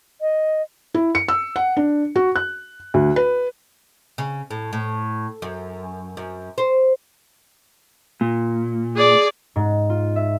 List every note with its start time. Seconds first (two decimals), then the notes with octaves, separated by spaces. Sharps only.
0.21 D#5
0.94 E4
1.15 C#7
1.29 E6
1.56 F#5
1.77 D4
2.16 F#4
2.36 F#6
2.94 D2
3.16 B4
4.18 C#3
4.51 A2
4.73 A2
5.42 F#2
6.17 F#2
6.58 C5
8.21 A#2
8.96 G#4 D5
9.56 G#2
9.90 F4
10.16 E5